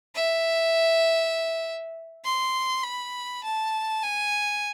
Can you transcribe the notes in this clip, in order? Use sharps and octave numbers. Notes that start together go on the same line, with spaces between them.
E5
C6
B5
A5
G#5